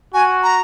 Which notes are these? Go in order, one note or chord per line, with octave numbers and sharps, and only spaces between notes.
F#4 G#5
A#5